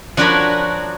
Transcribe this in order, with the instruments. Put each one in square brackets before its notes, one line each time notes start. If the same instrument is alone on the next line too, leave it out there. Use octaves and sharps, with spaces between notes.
[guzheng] F3 D4 F#4 A#4 C#5 B5